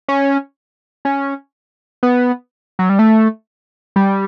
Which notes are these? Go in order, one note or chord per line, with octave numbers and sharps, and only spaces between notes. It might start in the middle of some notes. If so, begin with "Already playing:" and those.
C#4
C#4
B3
F#3
G3
A3
G3